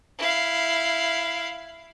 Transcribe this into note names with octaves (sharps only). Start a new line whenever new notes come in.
E4 F5